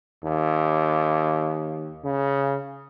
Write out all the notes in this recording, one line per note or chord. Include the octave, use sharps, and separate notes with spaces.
D#2
C#3